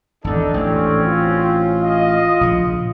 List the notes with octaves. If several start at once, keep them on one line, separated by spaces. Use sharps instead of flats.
G#1 E2 D3 D4 D#4 A4
A1 C4 C#4
F4
D#5 F5
A#1 C#3